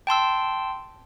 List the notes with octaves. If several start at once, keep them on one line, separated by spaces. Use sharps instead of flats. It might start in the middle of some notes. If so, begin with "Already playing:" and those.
G5 A5 C6 E6